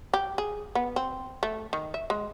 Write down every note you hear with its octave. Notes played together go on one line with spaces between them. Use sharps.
G4
G#4
B3
C4
A3
D#3
E5
G#3